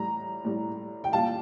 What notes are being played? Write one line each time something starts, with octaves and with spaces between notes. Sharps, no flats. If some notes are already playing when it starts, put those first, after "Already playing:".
Already playing: A2 G3 A#5
A2 G3
G5
A#2 G3 F5 A5